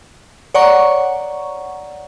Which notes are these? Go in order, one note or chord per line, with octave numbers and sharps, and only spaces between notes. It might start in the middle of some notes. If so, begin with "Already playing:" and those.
C#5 D5 F#5 A#5 C#6